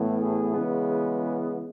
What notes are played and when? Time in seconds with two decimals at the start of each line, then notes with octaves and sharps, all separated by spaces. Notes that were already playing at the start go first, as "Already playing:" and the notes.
Already playing: A2 E3 B3
0.20 G#4
0.53 C#3 E3 G#3 B3